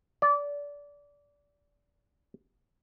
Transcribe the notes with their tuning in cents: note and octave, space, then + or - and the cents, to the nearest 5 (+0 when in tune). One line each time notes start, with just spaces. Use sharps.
D5 -25